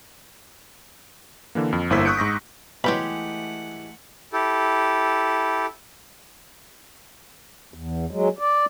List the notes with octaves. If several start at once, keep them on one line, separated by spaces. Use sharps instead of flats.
D3 E3 A#3
F2
G1 A#3 E4 C5 E6 B6
C#6 D#6 F#6 G6 C#7 D7
G#2 C#6 A#6 B6
B2 E3 F#3 G#3 A3 G4 F#5 B5
E4 G4 A4
E2
F#3 G#3
D5